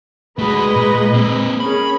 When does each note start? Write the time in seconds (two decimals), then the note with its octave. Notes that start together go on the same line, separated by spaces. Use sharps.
0.39 G#3 A3 F#4 B4 D#5
0.76 A#2
1.14 A#3 C4
1.60 C#4 G#4 A#4 B5